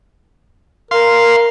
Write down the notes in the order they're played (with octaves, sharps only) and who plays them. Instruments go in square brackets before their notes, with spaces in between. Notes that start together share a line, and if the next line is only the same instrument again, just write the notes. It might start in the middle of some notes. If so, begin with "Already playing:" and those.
[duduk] A#4 [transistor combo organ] F5 C6